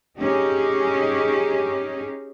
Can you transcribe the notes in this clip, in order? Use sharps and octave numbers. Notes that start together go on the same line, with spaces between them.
C#4 D#4 G4 G#4